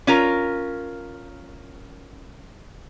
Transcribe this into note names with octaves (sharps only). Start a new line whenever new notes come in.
C#4 F4 A#4